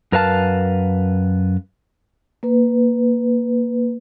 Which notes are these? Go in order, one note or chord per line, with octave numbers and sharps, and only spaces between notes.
F#2 A#4 B4 F5 A5
A#3 B4